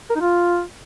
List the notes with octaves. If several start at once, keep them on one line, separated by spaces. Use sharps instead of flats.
A#4
D#4
F4